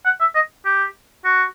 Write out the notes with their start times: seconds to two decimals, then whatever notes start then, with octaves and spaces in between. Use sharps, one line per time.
0.05 F#5
0.21 E5
0.35 D#5
0.66 G4
1.25 F#4